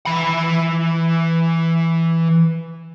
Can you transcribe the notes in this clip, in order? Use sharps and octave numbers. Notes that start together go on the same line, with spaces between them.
E3 B5